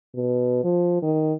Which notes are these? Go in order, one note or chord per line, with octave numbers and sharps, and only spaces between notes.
B2
F3
D#3